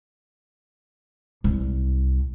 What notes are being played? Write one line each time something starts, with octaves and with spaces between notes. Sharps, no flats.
C2